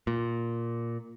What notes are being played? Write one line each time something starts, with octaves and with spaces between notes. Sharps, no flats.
A#2